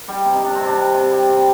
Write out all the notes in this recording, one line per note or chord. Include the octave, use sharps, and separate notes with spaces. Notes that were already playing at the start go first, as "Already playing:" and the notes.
Already playing: A#4
G3 G4
C3
D#4
G3 D4
C4
C3
D4
G3
C3
G3
C3